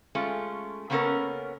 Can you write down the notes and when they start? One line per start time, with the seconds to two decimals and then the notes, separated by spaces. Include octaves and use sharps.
0.15 G#3 A3 C#4 F4
0.90 C#3 A#3 B3 C#4 A4 A#4